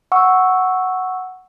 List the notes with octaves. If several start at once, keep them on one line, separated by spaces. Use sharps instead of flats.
F#5 C#6 E6